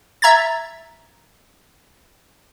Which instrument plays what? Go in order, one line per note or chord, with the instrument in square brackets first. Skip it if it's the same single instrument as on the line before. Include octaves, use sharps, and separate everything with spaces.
[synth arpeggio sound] E5 A#5 G#6 A6